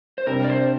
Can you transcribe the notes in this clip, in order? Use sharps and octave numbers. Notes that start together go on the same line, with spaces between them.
C5
C3 G3 D4 A#4
D5
C5